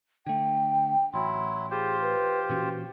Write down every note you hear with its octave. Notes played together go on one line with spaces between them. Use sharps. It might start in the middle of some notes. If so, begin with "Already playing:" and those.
D3 A3 G5
A1 F#3 E4 C6
F4 G4 G#4 C5
B4
A#2 E3 C#4 F#4